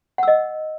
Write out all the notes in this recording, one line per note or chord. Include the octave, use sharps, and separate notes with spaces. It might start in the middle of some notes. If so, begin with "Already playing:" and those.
D#5 F#5 E6